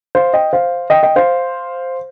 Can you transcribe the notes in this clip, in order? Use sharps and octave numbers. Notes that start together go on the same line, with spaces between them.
C5 F5
D#5 G5
C5 F5
D#5 G5
D#5 G5
C5 F5